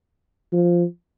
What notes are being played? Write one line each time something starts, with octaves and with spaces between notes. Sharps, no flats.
F3